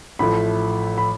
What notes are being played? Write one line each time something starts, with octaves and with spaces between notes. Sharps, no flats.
A1 A2 F3 A3 B5
B5